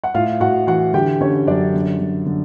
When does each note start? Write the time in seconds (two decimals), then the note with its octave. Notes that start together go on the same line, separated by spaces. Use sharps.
0.04 F#5
0.14 A2 F4 F5
0.40 A2 F#4 F#5
0.67 E3 F#4 F#5
0.94 D3 G4 G5
1.20 D3 C#4 C#5
1.47 F#2 D4 D5
1.74 D3
1.99 D3
2.26 D3